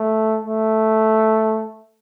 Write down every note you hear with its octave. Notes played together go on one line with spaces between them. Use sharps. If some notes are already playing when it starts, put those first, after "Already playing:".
Already playing: A3
A3